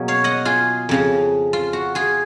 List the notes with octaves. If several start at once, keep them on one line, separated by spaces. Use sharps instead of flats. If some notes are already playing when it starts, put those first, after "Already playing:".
Already playing: B2 F#3 A#3 C#4 G#4
C#5 F5
D#5 F#5
F4 G#4
F2 C#3 F3
F4
F#4
F4 G#4